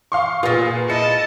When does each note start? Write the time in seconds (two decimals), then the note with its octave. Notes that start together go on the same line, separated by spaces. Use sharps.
0.12 F5 C6 C#6
0.43 A#2 B3 F4 G#4
0.90 E4 D#5 A5 C#7